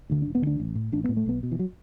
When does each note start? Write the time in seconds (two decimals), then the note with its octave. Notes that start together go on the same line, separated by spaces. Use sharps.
0.10 D2 D3
0.22 E1 D4
0.35 B3
0.42 D2 D3 D4
0.60 A1
0.75 A2
0.92 A1 D4
1.04 A2 B3
1.17 A3
1.26 B1 B3
1.43 B2
1.52 E3
1.59 F#3